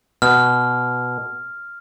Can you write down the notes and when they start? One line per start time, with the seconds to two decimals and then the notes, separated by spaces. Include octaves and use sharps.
0.22 B2 F6